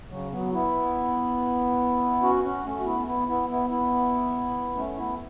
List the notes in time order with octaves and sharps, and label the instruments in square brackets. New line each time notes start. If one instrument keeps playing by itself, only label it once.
[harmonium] C#3 F#3
F#3 B3
B3 E4
C#4 F#4
C#4 F#4
A3 C#4
F#4
B3 E4
B3 E4
B3 E4
B3 E4
B3 E4
A3 C#4
B3 E4